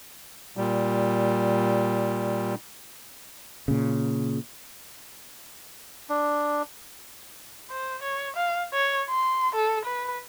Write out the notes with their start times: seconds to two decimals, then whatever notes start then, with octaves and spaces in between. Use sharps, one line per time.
0.57 A#2 G3
3.68 A#2 C#3
6.10 D4
7.70 C5
8.02 C#5
8.35 F5
8.74 C#5
9.10 C6
9.55 A4
9.85 B4